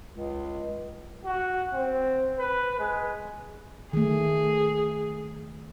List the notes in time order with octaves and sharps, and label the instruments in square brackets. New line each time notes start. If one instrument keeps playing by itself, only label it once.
[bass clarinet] C#2
[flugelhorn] F#4
C4
B4
G#3
[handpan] D#3 A3 [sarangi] G#4